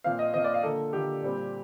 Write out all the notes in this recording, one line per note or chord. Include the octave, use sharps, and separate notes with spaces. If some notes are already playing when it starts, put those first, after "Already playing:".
A#2 F3 C4 F5
D#5
A#2 F3 C4 D#5
D5
F5
D3 F3 A#3 A4
D3 F3 A#3 G4
A#2 G3 C4